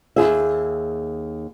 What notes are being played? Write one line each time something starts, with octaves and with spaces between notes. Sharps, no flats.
D#2 C#3 G#4 E5